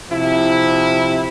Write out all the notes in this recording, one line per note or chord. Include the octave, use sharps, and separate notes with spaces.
C3 F3 E4